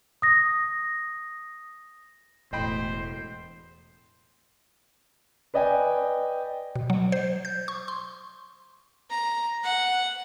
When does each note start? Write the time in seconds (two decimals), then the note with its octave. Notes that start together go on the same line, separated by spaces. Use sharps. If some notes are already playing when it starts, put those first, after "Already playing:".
0.22 D#6 A#6
2.53 E1 A2 C5 D#5 G5 B5
5.54 B4 D5 D#5 G5 G#5
6.76 B2
6.90 F#3
7.12 C5
7.45 G6
7.68 C#6
7.88 C6
9.10 A#5
9.63 F#5